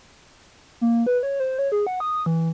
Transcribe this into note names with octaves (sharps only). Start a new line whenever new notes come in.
A#3
B4
C#5
C5
C#5
G#4
F#5
D#6
E3